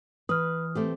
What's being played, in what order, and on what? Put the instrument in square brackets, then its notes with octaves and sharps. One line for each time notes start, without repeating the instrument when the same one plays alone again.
[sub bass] E3 [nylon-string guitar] B4 [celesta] D#6 F6
[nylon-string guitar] A3 C4 G4